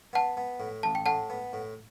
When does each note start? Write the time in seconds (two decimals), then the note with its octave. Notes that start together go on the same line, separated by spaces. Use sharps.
0.13 B3 F#5 A5
0.37 B3
0.60 A2
0.83 A1 A5
0.95 G5
1.06 A2 F#5 A5
1.30 B3
1.53 A2